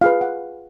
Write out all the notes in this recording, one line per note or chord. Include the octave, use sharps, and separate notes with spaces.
F4 G#4 B4 F5
F#5